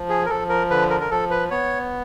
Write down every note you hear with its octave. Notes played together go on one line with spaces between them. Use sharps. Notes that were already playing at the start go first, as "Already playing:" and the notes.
Already playing: F3
G#4
A#4
F3 A4
A#4
D3 B4
A#4
A#4
F3 A4
B4
B3 C#5